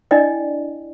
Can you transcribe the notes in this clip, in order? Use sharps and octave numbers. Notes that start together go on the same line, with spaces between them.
D4 E4 D5 D#5 G5